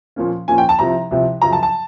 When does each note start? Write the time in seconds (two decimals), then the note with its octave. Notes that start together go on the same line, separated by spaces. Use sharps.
0.16 A#2 F3 A#3 C#4
0.48 A#2 F3 A#3 C#4 G#5
0.58 G5
0.69 A5
0.79 C2 C3 F3 A#5
1.11 C2 C3 F3
1.42 F#2 C#3 F3 A#5
1.53 A5
1.63 A5